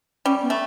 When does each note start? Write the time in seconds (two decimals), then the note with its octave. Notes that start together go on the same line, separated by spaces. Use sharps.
0.25 G3 C#4
0.41 B3
0.50 A3